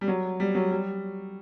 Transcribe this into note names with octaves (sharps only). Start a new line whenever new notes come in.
G3
F#3
G3
F#3
G3